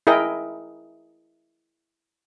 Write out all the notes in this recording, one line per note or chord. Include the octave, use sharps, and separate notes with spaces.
E4 G#4 A#4 D#5 G5